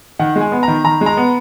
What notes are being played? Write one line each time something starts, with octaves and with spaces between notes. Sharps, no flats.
D#3 F#5
G#3
G#5
B3
A#5
D#3
D#3 A#5
G#3
A#5
B3